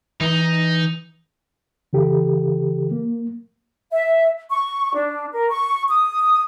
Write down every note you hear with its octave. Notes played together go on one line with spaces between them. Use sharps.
E3 D#4
C#3 E3 G4 A4
A#3
E5
C#6
D4
A#4
C#6
D#6